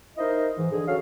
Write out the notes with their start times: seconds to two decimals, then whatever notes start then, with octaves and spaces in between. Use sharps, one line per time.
0.18 D#4 E4 A#4 C5 D#5
0.58 G#2 E3
0.72 D3 G#4
0.88 F#3 C#4 F#4 A4 F5